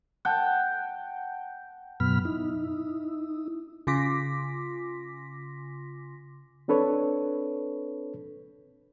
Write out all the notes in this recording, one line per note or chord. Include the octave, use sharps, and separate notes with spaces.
F#5 G5 A5
F#2 B2 F#3 B3 B5 F6
D#4 E4
C#3 F4 C6 D6 A#6 B6
C4 D4 A4 B4 C#5